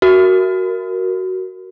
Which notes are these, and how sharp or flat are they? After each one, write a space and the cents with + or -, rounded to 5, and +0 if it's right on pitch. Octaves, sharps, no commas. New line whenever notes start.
F#4 +10 A#4 -5